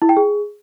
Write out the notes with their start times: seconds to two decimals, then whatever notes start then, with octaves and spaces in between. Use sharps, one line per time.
0.02 E4
0.09 G5
0.17 G#4